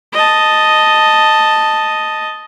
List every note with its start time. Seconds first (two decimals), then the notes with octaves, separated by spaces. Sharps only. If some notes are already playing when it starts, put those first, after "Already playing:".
0.13 D#5 A5